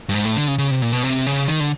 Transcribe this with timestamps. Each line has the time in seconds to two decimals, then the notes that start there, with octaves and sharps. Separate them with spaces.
0.09 G2
0.14 G#2
0.25 A2
0.36 D3
0.48 C#3
0.58 C#3
0.71 C3
0.82 A#2
0.92 B2
1.03 C3
1.27 C#3
1.48 D#3
1.60 D3